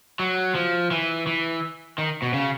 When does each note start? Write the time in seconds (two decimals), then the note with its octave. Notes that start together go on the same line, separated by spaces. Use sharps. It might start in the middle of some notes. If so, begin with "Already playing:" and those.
0.19 F#3
0.55 F3
0.91 E3
1.27 E3
1.98 D#3
2.22 B2
2.34 C#3